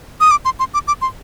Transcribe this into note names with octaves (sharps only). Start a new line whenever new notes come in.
D#6
D6
C6
C6
D6
D6
C6